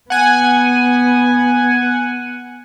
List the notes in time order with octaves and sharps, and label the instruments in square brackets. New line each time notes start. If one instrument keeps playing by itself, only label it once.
[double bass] B3 [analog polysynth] F#5 G#5